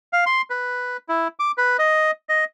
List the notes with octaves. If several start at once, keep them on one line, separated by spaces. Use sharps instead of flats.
F5
C6
B4
E4
D6
B4
D#5
D#5